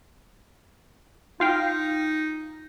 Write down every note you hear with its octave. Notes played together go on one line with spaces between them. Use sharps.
D#4 F4 F5 G5